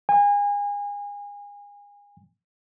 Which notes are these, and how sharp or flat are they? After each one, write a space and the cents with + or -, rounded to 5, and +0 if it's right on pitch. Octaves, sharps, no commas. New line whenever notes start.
G#5 -30